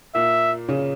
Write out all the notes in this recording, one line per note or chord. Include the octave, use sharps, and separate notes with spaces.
A#2 A#3 E5
C#3 C#4